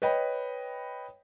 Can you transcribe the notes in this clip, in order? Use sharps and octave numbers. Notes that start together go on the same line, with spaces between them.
B4 C#5 D#5 G5 B5